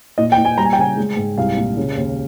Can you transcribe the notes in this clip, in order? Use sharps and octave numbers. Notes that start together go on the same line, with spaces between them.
A#2 D#5
G5
A#2
G#5
G3 A#5
G#5
G5
C#3 G#5
G#3
G#2
C2 F5
A#2
C#3
D#2